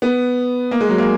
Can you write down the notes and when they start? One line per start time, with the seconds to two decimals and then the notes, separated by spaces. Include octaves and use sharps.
0.02 B3
0.71 A#3
0.81 G#3
0.89 F#3
0.98 A#3